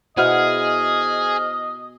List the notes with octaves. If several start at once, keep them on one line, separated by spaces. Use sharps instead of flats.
B2 E4 G#4 C5 D#5 F#5 F6